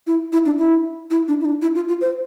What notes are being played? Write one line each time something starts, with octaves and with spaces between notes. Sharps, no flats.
E4
E4
D4
E4
E4
D4
E4
D4
E4
F4
F4
C5